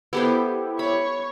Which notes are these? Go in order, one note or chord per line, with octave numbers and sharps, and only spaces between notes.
B3 E4 G4 A4 C5
C#5 B5